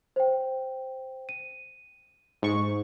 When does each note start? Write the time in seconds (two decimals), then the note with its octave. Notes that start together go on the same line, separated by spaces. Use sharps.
0.16 C5 G5
1.29 D#7
2.42 G#2 C#6